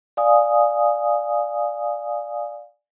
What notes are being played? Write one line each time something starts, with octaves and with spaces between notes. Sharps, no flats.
D5 F5 G#5 D#6